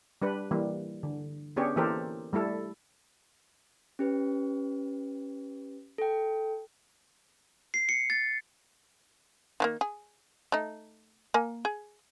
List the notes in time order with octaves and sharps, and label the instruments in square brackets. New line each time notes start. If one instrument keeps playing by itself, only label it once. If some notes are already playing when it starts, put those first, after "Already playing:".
[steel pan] G3 D4 B4
E3 G3 A#3
D3
B3 C#4 D4 G4 G#4 C#5
E3 A#3 G4 A4 A#4 C5
G3 A3 E4 A4
[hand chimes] C#4 G4 B4
A4 G5
[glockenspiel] C7
C#7
A6
[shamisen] D#3 F3 A#3
G#4
A3 D#4
A#3 G#5
G#4